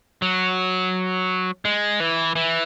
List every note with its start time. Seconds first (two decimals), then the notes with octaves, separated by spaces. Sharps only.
0.22 F#3
1.65 G#3
2.00 E3
2.36 E3